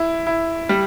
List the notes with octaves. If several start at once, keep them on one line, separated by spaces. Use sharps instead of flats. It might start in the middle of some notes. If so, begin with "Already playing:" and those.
Already playing: E4
E4
G3